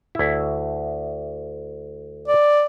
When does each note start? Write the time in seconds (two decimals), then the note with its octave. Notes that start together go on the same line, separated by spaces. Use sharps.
0.15 D2 E4
2.28 D5